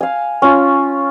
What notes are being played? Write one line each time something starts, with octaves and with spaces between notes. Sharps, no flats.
F5 G#5
C#4 F4